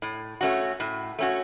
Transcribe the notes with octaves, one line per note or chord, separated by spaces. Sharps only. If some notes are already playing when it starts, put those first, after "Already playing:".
A2
A3 C#4 F#4
A2
A3 C#4 F#4